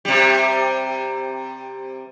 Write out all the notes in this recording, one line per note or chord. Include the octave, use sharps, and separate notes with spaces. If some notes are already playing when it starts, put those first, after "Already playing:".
C3 G3